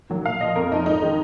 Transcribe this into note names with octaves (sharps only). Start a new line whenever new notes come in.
D#3 F#3 A#3
A#2 F5
F3 A#3 D#5
F2 A#4
F3 A#3 D#4
G#2 D#4
D#3 G#3